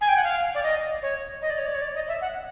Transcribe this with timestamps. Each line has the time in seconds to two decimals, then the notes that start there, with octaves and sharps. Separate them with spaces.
0.01 G#5
0.08 G5
0.16 F#5
0.24 F5
0.55 D5
0.63 D#5
1.02 C#5
1.42 D#5
1.50 D5
1.58 C#5
1.66 D5
1.74 C#5
1.81 D5
1.95 D#5
2.08 E5
2.21 F#5